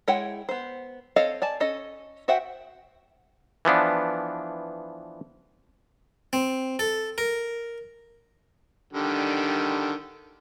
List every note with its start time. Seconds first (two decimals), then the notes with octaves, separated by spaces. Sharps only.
0.08 G#3 E4 C#5 F#5 G5
0.49 B3 C5
1.16 C4 A4 C#5 D#5 F5
1.42 D5 G#5 A5
1.60 C#4 A4 D#5
2.28 F#4 C5 E5 F#5 G5
3.65 E3 F3 B3 D4
6.33 C4
6.79 A4
7.18 A#4
8.93 D3 D#3 G3